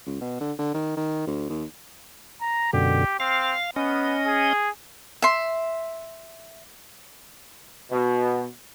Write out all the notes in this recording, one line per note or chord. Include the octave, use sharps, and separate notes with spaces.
C#2
B2
D3
D3
D#3
D#3
D2
D#2
A#5
F#2 B2 D3 G4
C4 F5
B3 C#4 D#5
G#4
E5 C6
B2